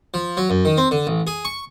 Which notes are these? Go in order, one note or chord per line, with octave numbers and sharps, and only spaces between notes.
F3
F#3
F#2
D#3
C4
D3
A1
G#4
C#6